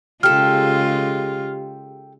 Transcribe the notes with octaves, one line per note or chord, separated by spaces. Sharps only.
C#3 G#3 F4 G4 A4 F6